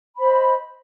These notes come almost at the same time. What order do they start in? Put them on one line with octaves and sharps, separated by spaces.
B5 C5 D#5